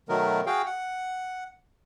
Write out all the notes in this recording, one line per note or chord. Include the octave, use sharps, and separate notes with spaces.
B2 D#3 F#3 A3 B3 A#4
F#4 G#4 F5 G5
F#5